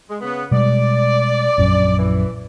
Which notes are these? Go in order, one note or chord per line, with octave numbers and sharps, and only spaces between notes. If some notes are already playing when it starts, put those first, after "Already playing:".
G#3
C#3 B3
B2 G3 G#3 D5
A#1 F#2 C#4
E3